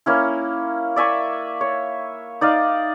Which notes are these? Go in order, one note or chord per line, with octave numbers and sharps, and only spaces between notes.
A#3 C#4 E4
D5 E5 G#5 C#6
C#5
D#4 D5 D#5 F5